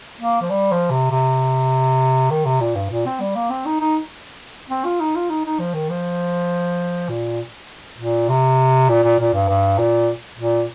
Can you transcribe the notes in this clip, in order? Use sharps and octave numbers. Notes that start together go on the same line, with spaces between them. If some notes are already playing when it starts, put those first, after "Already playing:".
A#3
F3
G3
F3
C3
C3
D#3
C3
A#2
G2
A#2
C4
G3
A#3
C4
D#4
D#4
C4
F4
D#4
F4
D#4
D#4
F3
D#3
F3
A#2
A#2
C3
A#2
A#2
A#2
G2
G2
A#2
A#2